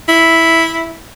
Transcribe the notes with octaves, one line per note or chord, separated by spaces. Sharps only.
E4